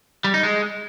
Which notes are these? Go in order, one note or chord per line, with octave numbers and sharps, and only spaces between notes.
G3
D#4
G#3